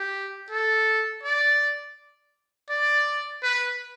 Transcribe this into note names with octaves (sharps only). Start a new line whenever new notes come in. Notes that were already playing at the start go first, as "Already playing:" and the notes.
Already playing: G4
A4
D5
D5
B4